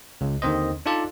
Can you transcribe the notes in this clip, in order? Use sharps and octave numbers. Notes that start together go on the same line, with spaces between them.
C#2
D#2 D3 D#3 C4 C5 D#5
D4 D#4 F4 A4 D5